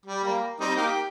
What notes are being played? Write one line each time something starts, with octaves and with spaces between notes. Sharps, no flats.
G3
G3 A#3
G3 C4 D#4
A#3 D#4 G4